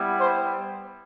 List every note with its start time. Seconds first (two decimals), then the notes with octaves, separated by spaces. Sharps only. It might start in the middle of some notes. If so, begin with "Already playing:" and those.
Already playing: G3 B3 E4 G4
0.17 C5